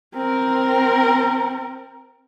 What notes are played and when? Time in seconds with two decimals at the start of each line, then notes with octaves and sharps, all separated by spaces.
0.15 C4 A#4